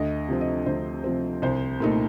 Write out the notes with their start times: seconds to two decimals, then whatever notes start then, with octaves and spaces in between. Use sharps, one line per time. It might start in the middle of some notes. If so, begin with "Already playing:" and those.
Already playing: D2 D#5
0.28 C3 F3 C4
0.41 D#5
0.66 D2 C5
1.04 C3 F3 C4
1.42 C2 C5
1.80 A#2 A3 D#4